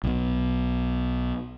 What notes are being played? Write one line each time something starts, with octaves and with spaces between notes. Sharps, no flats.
B1 B2